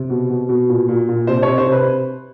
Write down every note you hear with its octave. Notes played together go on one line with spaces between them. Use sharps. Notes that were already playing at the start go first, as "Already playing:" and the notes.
Already playing: C3
B2
B2
B2
A#2
A#2
A#2
C3 C5
C#5
C3
C5
C3 B4